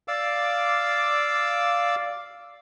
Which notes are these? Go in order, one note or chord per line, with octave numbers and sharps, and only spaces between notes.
D5 F5 D6 E6